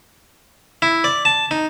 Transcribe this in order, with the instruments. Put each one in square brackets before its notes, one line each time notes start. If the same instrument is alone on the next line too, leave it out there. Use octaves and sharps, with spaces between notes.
[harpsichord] E4
D5
A5
D#4